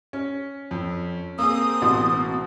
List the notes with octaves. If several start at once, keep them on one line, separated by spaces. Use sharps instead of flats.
C#4
F2
A#3 C4 G#4 D#6 E6
A1 B2 C6